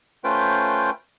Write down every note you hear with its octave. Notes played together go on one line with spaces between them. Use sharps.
A3 C#4 F4 B4 C5 G5